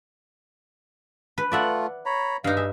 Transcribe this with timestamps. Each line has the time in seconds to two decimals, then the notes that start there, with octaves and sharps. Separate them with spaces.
1.38 B4
1.52 A3 F4 D5 E5 F#5
2.06 C#5 A#5 B5
2.44 G2 D#4 F5
2.57 G#4 E5